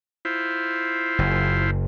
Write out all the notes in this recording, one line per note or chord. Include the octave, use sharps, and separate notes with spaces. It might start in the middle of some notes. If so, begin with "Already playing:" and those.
E4 F4 C5
F#1